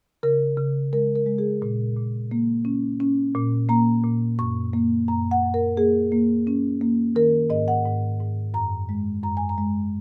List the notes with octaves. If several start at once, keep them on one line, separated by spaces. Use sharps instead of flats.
C#3 A#4
C#3
G#3 A#4
A#4
G#3
G#4
A#2
A#2
A#3
C#4
C#4
A#2
A#3 A#5
A#2
F#2 C#6
A#3
F#2 A#5
F#5
F#2
A#4
A#3 G#4
A#3
C#4
A#3
D#3 A#4
G#2 D#5
F#5
G#2
G#2
F#2 A#5
G#3
F#2 A#5
G#5
A#5
G#3